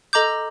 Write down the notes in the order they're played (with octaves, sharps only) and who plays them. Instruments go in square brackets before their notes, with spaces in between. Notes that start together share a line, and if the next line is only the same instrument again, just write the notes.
[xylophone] A4 D#5 A#5 D6 G6